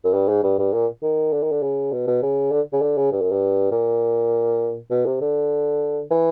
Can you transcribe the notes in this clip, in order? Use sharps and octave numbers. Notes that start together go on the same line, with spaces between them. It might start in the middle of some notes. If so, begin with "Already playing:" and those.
F#2
G2
G#2
G2
G2
A#2
D#3
D3
D#3
D3
C#3
B2
B2
C#3
D3
C#3
D3
C#3
G2
F#2
G2
A#2
B2
C3
D3
E3